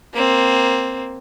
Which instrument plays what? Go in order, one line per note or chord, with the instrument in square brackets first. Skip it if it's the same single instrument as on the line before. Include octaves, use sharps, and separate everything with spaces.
[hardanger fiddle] A#3 C4